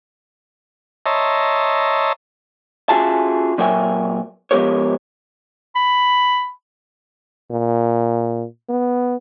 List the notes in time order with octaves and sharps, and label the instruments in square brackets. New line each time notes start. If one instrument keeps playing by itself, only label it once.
[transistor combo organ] C#5 D#5 E5 A5 A#5 C6
[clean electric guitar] C#4 F4 F#4 G#4 E5 A5
A#2 F#3 A#4 E5 G5 G#5
F3 G#3 B3 G4 A#4 C#5
[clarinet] B5
[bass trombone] A#2
B3